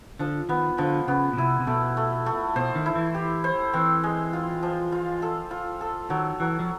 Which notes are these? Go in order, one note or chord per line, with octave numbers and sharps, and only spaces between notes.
D3 F3
D#3 B3
D3 F3
C#3 B3
B2
C3 E4
C3
B2 A3
A3
A3
B2 C5
D#3
E4
E3
G4
C5
E3 C4
G#3
F4
F3
F4
A4
F4
A4
D#3 F#3
E3 F#3
F3